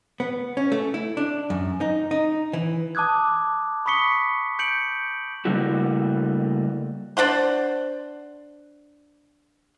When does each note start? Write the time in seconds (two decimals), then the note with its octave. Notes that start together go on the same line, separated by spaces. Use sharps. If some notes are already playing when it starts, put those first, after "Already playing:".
0.20 B3
0.57 C#4
0.72 A3
0.94 E4
1.17 D4
1.50 F#2
1.81 D#4
2.11 D#4
2.53 E3
2.95 A5 D6 D#6 F#6 G#6
3.86 B5 C#6 D#6 B6 C#7 G7
4.59 G6 C#7 D7 F#7
5.45 C#3 G3 A3 A#3 E4 F#4
7.17 D4 C5 F#5 C6